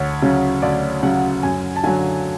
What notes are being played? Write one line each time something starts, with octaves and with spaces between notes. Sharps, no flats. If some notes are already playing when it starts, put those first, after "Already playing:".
Already playing: D2 C#5
C#3 F#3
D2 D5
C#3 F#3 F#5
F#2 G#5
A5
D3 F#3 G#5